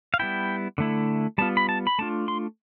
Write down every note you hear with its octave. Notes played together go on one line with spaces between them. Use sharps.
F5
G3 B3 E4 G5
D3 A3 E4
G3 B3 F4 A5
B5
A5
B5
A3 D4 F4 A5
C6